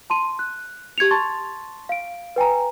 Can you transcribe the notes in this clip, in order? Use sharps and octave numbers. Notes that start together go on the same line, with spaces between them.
A5 C6 D#7
F#6
G4 G#6 C#7 F7
A5 C6 C#6 A6
F5 D7
B4 G5 G#5 A#5